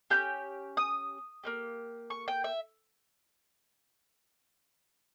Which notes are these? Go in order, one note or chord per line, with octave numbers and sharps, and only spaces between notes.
C#4 E4 G4 G6
D#6
A#3 C#4 G4
C#6
G5
E5